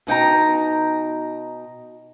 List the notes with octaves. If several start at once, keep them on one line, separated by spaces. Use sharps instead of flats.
B2 D#4 G5 A#5